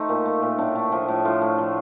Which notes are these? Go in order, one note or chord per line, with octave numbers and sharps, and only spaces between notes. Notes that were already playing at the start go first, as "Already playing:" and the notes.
Already playing: A3 D#4 G4 C5
A#2
A3
A#2
A2 D4
A3
F3
A2
A2 F4
A3
F3